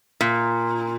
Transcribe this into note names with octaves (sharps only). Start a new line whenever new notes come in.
A#2